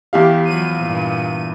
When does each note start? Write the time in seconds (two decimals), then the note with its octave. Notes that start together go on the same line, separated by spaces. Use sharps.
0.13 E2 E4 G4 F5
0.45 F3 F#3 D#7
0.81 G2 A#2